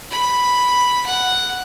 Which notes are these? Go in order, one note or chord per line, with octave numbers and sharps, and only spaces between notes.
B5
F#5